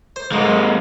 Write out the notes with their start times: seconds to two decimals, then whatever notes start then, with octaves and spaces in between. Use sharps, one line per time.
0.16 C5
0.32 B1 G#2 G#3 A#3